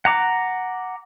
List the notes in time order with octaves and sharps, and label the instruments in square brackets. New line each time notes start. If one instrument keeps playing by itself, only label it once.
[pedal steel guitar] F#5 A#5 D6